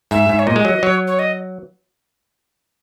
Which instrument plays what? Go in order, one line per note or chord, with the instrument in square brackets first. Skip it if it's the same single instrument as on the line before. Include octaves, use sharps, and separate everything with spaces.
[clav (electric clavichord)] G#2 [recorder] E5
[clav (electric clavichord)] G#2
[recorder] C#5
[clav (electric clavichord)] A#2 [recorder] D#5
[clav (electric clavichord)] G#3
F#3
[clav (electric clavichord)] F#3 [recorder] C#5
[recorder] C#5
D#5